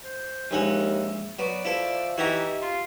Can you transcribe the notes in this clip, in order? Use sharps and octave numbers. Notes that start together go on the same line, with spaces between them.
C5
A#1 D#2 G#3 E5 F#5
F#3 B3 D5
F3 E4 A4 E5
E3 D#4 F#4 G4 A#5
F4 C6